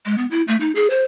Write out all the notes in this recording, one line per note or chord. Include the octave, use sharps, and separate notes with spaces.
G#3
B3
E4
A3
D#4
G#4
C5